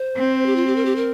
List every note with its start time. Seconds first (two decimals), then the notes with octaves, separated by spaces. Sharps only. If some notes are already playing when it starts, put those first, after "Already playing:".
Already playing: C5
0.17 C4
0.46 G4
0.56 F4
0.66 G4
0.76 A#4
0.85 G4
0.96 A#4